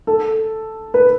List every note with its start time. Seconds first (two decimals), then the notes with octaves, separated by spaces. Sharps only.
0.07 A4
0.94 B4